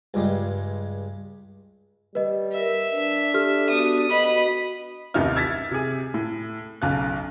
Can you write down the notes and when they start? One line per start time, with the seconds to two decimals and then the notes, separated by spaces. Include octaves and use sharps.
0.14 C#2 G2 G3 G#3
2.15 G3 B4 D#5
2.54 A#4 E5 E6
2.93 D4 B4
3.34 G4 A4 F6
3.70 B3 F#4 D#6
4.10 B3 F#4 D#5 B5
5.14 A1 D#2 C3 D#4 E5 F6
5.36 E6 G#6 A6 B6
5.71 C3 G#4
6.14 A2
6.82 B1 C#3 F5 F#6